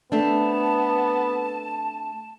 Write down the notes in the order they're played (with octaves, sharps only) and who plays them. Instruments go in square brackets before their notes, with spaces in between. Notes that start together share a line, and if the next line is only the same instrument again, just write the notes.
[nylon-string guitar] A3 C4 D4 [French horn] B3 [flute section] A5